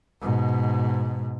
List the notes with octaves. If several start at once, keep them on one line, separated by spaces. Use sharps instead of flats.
G#2 B2